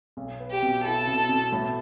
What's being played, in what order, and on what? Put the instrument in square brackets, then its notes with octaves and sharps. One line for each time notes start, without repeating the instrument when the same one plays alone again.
[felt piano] B1
B3
[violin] G4
[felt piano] B2
[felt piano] E4 [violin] A4
[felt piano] B2
B2
A2